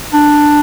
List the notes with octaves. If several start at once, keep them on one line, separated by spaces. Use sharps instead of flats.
D4